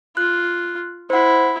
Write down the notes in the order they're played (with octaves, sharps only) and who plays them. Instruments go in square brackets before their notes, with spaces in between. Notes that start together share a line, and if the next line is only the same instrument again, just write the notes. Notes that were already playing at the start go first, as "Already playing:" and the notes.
[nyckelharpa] F4 [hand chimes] F#6
[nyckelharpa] E4 [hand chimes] C5 F#5